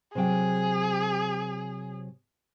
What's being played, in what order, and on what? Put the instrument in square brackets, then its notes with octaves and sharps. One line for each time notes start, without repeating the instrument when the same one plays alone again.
[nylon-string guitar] C3 F#3 G5 [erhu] G#4